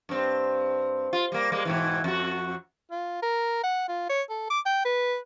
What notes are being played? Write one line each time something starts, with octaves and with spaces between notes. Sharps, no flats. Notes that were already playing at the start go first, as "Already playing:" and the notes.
G2 C4
F4
G3 A#3
G3 G#3 A#3
G#2 B2 E3
F2 F#4
F4
A#4
F#5
F4
C#5
A4
D6
G5
B4